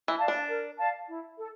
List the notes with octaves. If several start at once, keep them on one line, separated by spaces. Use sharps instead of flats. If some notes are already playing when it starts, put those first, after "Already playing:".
E3
D5 F5 A5
D4
A#4
D5 F5 A5
E4
A4